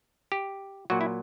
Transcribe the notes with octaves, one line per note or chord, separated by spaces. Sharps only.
G4
A#2 F#3 F#4
E4